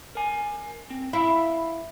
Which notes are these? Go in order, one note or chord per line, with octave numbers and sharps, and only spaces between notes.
A#4 G#5
C4
E4 F5 B5